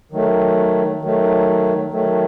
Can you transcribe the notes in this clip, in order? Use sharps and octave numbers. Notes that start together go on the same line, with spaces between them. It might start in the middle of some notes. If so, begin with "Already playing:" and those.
D#3 F#3 A3
D#3 F#3 A3
D#3 F#3 A3